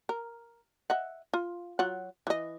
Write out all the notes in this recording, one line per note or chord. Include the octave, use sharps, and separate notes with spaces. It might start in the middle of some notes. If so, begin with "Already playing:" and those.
A#4
D#5 E5 F#5
F4
F#3 F4 F#5
E3 D#5